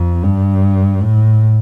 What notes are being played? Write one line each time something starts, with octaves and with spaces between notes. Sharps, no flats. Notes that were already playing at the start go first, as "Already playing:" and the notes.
Already playing: F2
G2
A2